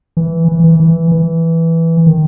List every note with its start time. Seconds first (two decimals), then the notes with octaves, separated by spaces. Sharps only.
0.17 E3
0.48 E3
0.64 E3
0.80 E3
1.12 E3
2.07 D#3